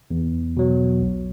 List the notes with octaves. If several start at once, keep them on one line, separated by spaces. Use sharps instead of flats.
E2
B2 F#3
B1